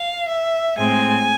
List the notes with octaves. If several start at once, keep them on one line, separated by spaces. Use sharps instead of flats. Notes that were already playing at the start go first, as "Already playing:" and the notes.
Already playing: F5
E5
A2 G#3 C4 G#5